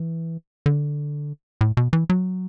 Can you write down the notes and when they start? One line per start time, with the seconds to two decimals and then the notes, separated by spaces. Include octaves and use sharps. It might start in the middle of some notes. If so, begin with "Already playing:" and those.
Already playing: E3
0.66 D3
1.61 A2
1.77 B2
1.93 E3
2.10 F#3